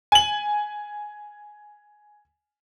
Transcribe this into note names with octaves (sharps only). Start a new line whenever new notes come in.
G#5 F#7